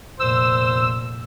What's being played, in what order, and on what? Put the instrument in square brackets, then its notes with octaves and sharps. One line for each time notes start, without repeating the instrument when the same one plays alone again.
[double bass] F1 A#2 [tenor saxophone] C5 [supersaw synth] E6